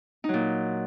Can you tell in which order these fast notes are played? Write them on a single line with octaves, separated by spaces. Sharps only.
D#4 F#3 A#2